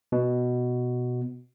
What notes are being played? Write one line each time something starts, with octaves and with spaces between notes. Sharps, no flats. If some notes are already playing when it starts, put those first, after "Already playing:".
B2